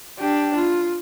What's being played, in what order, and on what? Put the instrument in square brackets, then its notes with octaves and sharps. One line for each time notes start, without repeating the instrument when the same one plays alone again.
[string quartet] D4 [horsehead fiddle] G4
[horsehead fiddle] F4